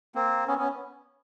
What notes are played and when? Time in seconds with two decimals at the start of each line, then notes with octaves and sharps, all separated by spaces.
0.15 A#3 C4
0.48 B3 C#4
0.58 B3 C#4